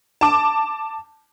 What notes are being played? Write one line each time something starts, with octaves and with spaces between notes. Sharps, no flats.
A5 D6